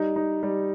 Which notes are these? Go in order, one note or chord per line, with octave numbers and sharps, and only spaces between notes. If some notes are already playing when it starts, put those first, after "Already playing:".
Already playing: G3 D#4
D#4
G3